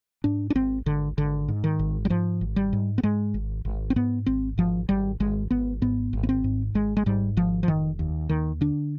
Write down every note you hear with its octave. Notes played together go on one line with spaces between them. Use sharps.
G#2 D4
D4
G#1 C4
G#1 D3
G#1 D3
G#2
D#3
G#1
G3
G#2 F3
G#1
G3
G#2
B3
G#2 G#3
G#1
G#1
C4
G#2 B3
G#1 C4
G#1 F3
G#1 G3
G#1 G#3
G#1 B3
G#2 B3
G#1
B3
C4
G#2
G#1 G#3
G#3
G#2 G3
G#1 F3
F3
F1 D#3
D#2
D#2 D#3
D3 D4